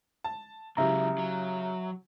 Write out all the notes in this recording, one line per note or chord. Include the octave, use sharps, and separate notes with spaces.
A5
C#2 C#3 F#3 E4 G4 E5 A#5
F#3